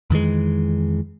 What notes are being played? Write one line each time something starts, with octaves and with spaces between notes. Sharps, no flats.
F2 D#3 E3 G#3